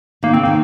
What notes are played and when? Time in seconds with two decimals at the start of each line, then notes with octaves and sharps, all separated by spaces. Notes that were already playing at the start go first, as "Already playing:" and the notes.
0.23 D#3 A#3
0.33 C#3 C4
0.44 D#3 A#3